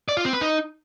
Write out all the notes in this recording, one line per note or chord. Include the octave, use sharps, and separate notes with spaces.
D5
F4
C4
B4
D#4